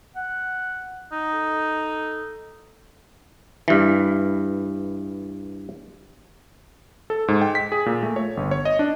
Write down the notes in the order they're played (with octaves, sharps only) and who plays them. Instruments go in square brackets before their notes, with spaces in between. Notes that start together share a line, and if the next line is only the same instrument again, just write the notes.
[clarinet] F#5
[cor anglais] D#4
[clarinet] A4
[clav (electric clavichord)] G2 E3
[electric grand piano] A4
G#2
G5
B6
G#4
A#2
A3
C#5
G1
C#5
D#5
D4